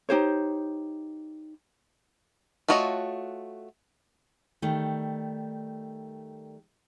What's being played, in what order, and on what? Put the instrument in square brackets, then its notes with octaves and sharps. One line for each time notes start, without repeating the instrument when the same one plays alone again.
[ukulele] D#4 G4 C5 C#5
[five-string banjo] A3 F4 F#4 C#5 D#5
[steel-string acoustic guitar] D#3 G3 A3